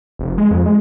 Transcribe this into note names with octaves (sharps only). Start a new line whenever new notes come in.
F1
G#3
F2
G#3